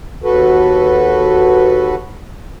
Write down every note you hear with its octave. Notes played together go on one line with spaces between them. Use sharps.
D#2 F#4 A4 B4